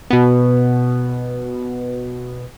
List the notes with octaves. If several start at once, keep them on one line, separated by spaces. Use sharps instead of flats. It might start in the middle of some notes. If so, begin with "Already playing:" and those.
B2 B3